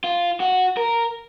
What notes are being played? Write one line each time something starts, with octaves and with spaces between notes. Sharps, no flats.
F4
F#4
A#4